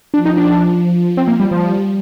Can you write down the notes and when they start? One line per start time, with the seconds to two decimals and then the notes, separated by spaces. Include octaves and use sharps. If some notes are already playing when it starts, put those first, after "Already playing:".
0.14 F3 D4
0.25 D#4
0.37 D4
0.48 F3
1.17 C4
1.28 A#3
1.40 G3
1.51 F3 G3